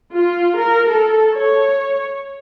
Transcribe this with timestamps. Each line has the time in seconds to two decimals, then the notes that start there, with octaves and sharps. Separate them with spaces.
0.14 F4
0.59 A#4
0.89 A4
1.36 C#5